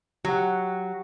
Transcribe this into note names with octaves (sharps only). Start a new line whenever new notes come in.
F#3 G4 F#5